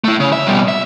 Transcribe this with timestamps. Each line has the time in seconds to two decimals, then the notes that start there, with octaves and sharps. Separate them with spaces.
0.04 A3 E4
0.20 C#3
0.33 E5
0.47 B2 G3
0.68 E5